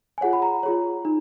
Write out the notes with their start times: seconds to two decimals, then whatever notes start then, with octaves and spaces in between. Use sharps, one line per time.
0.18 G#5
0.21 F4 G#4 C#5 F#5
0.33 B5
0.42 A#5
0.63 F4 G#4 C#5
1.05 D#4